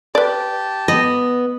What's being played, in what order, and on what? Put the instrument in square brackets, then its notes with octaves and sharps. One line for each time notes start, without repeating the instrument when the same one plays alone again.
[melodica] G4 A5 [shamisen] B4 D5
[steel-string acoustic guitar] B3 [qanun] D#5